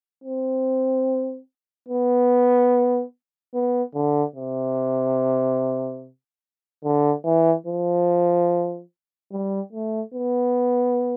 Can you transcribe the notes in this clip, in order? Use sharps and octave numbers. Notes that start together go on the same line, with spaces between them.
C4
B3
B3
D3
C3
D3
E3
F3
G3
A3
B3